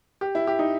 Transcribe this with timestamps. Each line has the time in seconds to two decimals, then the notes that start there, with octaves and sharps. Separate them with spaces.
0.21 G4
0.35 E4
0.47 G4
0.59 D#4